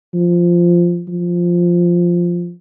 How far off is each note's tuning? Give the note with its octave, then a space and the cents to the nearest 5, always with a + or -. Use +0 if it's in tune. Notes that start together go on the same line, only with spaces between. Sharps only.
F3 -5
F3 +0